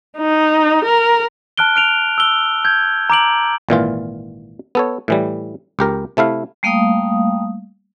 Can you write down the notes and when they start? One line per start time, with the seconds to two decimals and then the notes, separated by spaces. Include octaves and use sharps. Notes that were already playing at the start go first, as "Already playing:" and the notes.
0.17 D#4
0.85 A#4
1.58 A5 F6 F#6 D7 G7
1.76 F6 D7 F7
2.18 E6 G7
2.65 G6 G#6
3.10 A#5 D6 D7 F#7
3.69 G#1 A#2 E3 F4
4.75 B3 A4 C#5
5.08 A2 E3 G3
5.79 C#2 G4 A#4
6.17 C3 A3 E4 F5
6.63 G3 A3 A#3 F5 G5 D#6